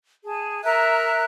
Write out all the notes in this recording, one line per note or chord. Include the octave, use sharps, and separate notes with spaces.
G#4 A5
A#4 E5 A#5 F#6